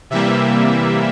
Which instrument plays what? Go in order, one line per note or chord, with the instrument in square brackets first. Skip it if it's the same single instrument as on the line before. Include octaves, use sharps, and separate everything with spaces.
[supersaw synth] C3 E3 G3 A#3 E5